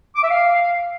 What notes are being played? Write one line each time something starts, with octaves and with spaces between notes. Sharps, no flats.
D6
E5
F5